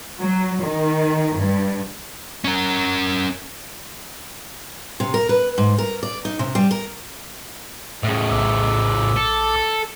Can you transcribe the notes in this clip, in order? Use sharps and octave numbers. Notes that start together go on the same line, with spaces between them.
F#3
D#3
G2
C#4 A#4
C3
A#4
B4
G#2
A#4
D5
D#4
C3
G3
A#4
A2 C#3
A#1 D6 E6
A4